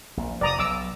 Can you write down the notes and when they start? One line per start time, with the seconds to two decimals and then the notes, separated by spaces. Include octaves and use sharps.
0.17 A#1
0.41 F1 D5 A#5 D#6
0.59 B1 D6 E6